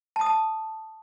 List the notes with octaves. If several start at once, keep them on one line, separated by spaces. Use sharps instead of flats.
A5
D#6
A5